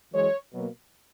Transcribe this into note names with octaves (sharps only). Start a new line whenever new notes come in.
F#2 E3 G#3 C#5
B2 F#3 A#3